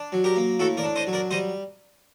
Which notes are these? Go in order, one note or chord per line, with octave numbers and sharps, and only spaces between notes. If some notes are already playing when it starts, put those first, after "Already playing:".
Already playing: D4
F#3
G4 A#4
A#3
A2 F#4 A4
A#4 D5
D4
C5 D#5
F#3
A#4 D5
G3 C5 D#5